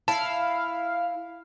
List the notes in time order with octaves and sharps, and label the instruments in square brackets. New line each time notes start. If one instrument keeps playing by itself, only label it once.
[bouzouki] E4 [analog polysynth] F5 [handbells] A5